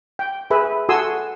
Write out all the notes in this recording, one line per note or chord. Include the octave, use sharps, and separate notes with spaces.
G5
G#4 B4 E5 B5
F#4 A4 G#5 C6 D#6 E6